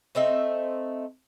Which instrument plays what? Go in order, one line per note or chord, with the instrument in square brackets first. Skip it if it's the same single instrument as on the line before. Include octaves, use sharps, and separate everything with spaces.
[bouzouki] A3 C4 D#4 E5